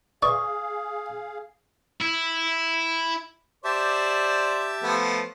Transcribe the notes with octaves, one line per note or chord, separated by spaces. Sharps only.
G#4 B4 D5 E5 F5 C#6 D#6
E4
G4 C5 D5 E5 A5
F3 A3 B3